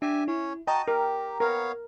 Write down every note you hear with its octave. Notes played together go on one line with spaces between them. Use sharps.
D4 G4 E5 G#5
C#4 E4 C#5
F#4 D#5 G5 A5 A#5
G4 A#4
B3 A#4 C#5 F5